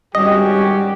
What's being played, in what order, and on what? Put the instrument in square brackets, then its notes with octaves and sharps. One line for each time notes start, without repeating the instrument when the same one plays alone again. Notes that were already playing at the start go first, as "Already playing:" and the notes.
[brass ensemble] G#1 C#4 F#4 [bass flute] G3 [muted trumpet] G4 [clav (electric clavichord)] D#5